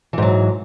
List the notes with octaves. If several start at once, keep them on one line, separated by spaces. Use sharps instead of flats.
G#2 E3 F#3